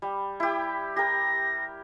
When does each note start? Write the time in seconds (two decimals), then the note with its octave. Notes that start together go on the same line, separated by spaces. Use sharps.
0.02 G3
0.40 E4 G4
0.96 G4 A#4 A#6